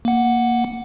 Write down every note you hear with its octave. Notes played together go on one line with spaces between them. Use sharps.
A#3 F#5